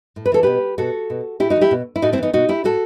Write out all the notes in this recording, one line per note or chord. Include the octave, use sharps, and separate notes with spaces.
A2
B4
E3 A4
B2 G4 B4
B2 F#4 A4
B2
A2 E4 G4
D#4 F#4
E3
E4 G4
B2
E4
A2 D#4 F#4
C4 E4
E3 B3 D#4
B2 D#4 F#4
E4 G4
A2 F#4 A4